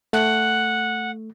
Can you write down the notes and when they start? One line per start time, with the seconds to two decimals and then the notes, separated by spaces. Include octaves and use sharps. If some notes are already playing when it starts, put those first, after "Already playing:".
0.13 A3 F#5